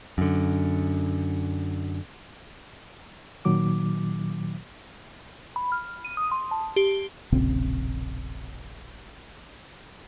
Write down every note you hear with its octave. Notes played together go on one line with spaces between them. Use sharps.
F#2 D3
A#2 D#3 F#3 D6
B5
F6
D#7
D#6
C6
A5
G4
E1 A#1 C#3 C4